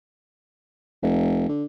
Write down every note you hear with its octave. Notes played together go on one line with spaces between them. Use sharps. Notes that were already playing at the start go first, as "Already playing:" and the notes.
F1
D3